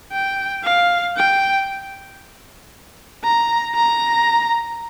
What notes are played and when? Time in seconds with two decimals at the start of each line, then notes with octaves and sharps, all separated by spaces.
0.12 G5
0.64 F5
1.16 G5
3.24 A#5
3.75 A#5